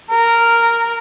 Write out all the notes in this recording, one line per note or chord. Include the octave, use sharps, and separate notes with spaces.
A#4